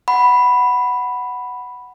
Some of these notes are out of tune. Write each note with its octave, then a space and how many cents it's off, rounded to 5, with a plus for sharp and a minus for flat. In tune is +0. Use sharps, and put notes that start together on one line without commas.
F#5 +5 B5 +0